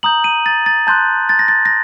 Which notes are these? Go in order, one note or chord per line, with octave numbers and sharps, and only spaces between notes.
A#5 D#6 G6 F#7
D#7
A6
A6
A5 C6 F#6 G6
A6
A#6
A6
A#6